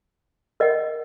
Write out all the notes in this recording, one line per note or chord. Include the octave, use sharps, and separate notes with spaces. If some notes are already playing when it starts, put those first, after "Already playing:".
A#4 D#5 F#5